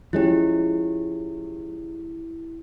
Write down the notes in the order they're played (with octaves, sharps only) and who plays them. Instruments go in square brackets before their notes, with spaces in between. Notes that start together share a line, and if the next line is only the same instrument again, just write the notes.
[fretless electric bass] F3 G#3 C#4 [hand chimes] E4 G4